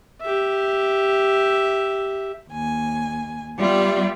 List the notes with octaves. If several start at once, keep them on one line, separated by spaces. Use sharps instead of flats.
G4 E5
D#2 G#5
G3 B3 F4 G4 D5 E5